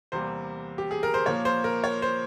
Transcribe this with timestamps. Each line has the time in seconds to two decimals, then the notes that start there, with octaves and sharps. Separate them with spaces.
0.12 E2 C3 G3 A#3 C5
0.78 G4
0.91 G#4
1.03 A#4
1.14 C5
1.26 A#2 F3 A#3 C#5
1.45 C5
1.64 A#4
1.84 C#5
2.02 C5